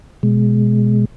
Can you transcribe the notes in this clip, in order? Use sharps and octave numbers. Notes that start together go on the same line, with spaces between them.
B2 G#3